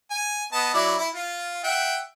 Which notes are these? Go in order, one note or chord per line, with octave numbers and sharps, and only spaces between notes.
G#5
B3 D#5 A5
F#3 E4 D5
E4
F4
E5 F#5 G5